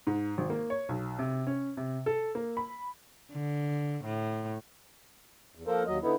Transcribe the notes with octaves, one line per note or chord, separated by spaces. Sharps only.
G#2
G#1
A#3
C#5
B1
C3
C#4
C3
A4
A#3
B5
D3
A2
E2
F3 A#3 A4 A#4 C5
D#2 F#3 D#5
D3 B3 D#4 E4